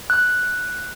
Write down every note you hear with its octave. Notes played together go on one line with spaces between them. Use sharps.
F#6